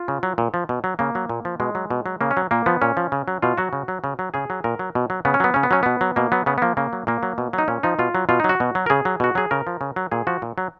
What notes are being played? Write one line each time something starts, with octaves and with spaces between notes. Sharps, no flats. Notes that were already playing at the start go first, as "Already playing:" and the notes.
Already playing: F4
C#3
F#3
A#2
F3
B2
F#3
C#3 A#3
F#3
A#2
F3
B2 G#3
F#3
B2
F#3
C#3 A#3
C#4
F#3
A#2 A#3
F3 B3
A#2 C#4
F3
C#3
F#3
B2 F4
F#3 F#4
C#3
F#3
C#3
F#3
C#3 G#4
F#3
A#2 A#4
F#3
B2
F#3
C#3 B3
C#4
F#3 B3
C#3 C#4
B3
F#3 C#4
B2 B3
F#3
B2 A#3
F#3 B3
C#3 B3
B3
F3 A#3
C#3 A#3
F#3
A#2 A#3
F#3
B2
F#3
D#4
A#2 C#4
F3 D#4
B2 F4
F#3
B2 F4
F#3 D#4
F#4
B2
F#3
A#4
C#3 G#4
F#3
B2 F#4
F#3 G#4
C#3 A#4
F3
C#3
F#3
A#2 G#4
F3 F#4
A#2
F#3